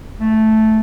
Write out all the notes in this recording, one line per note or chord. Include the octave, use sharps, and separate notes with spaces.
A3